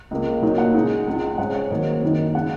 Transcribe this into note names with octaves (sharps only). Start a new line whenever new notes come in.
C#2 C#3 A#3
A#2 F#3 A#3 D#4
F#5
C#3 G#3 D#4
C#2 C#3 G#3
G#2 G#3 C#4 F#5
C#5
G#2 D#3 F#3 A#3
F#2 D#3 A#3 D#4
C#3 G#3 F#5